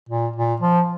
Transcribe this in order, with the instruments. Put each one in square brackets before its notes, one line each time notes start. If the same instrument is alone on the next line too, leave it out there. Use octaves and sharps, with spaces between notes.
[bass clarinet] A#2
A#2
F3